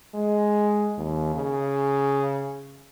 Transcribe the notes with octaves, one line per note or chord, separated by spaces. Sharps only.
G#3
D#2
C#3